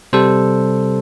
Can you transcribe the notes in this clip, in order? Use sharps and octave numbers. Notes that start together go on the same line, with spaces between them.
C3 G3 A4 C5